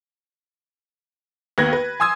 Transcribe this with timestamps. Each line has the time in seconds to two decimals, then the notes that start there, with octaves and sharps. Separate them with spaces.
1.58 D#2 B3 B4 G#6 A#6
1.73 B4
2.00 G#5 C6 D#6 E6 G#6